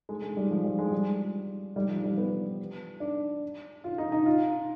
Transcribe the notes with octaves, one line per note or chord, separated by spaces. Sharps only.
G#3
G#3
G3
F3
G3
G#3
G3
G3
F3
G3
B3
D4
F4
D#4
D#4
F4